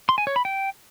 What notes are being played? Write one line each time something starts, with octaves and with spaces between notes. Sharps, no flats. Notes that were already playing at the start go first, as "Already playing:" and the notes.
C6
G#5
C#5
B5
G5